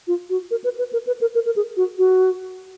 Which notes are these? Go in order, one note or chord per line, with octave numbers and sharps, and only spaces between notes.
F4
F#4
A#4
B4
B4
A#4
B4
A#4
A#4
A#4
G#4
F#4
F#4